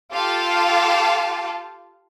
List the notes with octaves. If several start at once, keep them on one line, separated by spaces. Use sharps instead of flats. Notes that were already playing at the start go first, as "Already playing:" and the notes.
F4 G4 A4 F5 A5